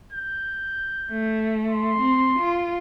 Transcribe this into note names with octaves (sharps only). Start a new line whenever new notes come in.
G6
A3
C6
C4
F4